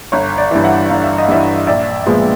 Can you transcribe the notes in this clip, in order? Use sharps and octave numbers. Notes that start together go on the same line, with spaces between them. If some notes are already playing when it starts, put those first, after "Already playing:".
G1 C#5
D5
G2 E3
E5 F#5
G1 F5
E5
D#5
G2 E3 D5 E5
A#1 D5 E5
A#2 F3 G#3 B3